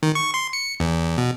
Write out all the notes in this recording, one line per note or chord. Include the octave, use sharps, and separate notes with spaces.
D#3
C#6
C6
C#7
E2
B2